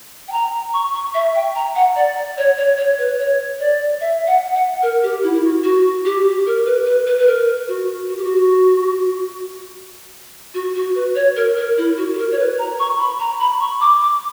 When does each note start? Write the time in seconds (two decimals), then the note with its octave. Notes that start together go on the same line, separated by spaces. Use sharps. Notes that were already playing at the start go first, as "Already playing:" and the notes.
0.28 G5
0.32 A#5
0.74 C#6
0.94 C#6
1.14 E5
1.35 G5
1.55 A#5
1.76 F#5
1.96 D5
2.16 D5
2.38 C#5
2.58 C#5
2.78 C#5
2.98 B4
3.19 C#5
3.60 D5
4.01 E5
4.27 F#5
4.55 F#5
4.83 A#4
5.03 G4
5.23 E4
5.34 E4
5.44 F#4
5.64 F#4
6.05 G4
6.46 A#4
6.66 B4
6.86 B4
7.07 B4
7.18 B4
7.27 A#4
7.68 F#4
8.09 F#4
8.17 G4
8.24 F#4
10.54 F#4
10.75 F#4
10.95 B4
11.15 C#5
11.36 A#4
11.57 A#4
11.78 E4
11.97 F#4
12.13 G4
12.18 A#4
12.32 C#5
12.39 B4
12.59 A#5
12.80 C#6
13.00 B5
13.20 A#5
13.40 B5
13.61 C#6
13.81 D6
14.02 D6